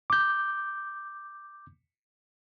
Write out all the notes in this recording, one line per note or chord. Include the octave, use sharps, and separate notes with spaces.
D6 G6